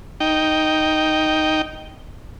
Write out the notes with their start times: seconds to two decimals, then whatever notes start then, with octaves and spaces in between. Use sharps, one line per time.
0.20 D#4 G5